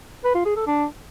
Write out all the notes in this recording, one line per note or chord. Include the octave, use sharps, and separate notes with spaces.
B4
F4
G#4
A4
D4